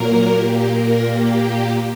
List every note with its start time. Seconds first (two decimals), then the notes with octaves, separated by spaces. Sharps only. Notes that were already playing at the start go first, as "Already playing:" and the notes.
Already playing: A#2 F#3 A#3 A#4
0.29 A#2 A#3 G4
0.65 A#4
1.02 G4